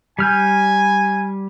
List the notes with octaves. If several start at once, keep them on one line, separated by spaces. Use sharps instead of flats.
G3 G#5 F6 G6